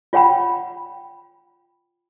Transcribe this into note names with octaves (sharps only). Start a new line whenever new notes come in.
F4 C#5 F#5 G5 B5